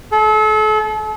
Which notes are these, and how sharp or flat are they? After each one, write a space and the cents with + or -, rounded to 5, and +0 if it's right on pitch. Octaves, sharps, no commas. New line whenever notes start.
A4 -35